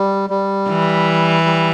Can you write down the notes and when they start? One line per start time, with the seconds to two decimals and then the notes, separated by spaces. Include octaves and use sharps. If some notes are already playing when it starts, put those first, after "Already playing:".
Already playing: G3
0.30 G3
0.68 E3
1.45 G3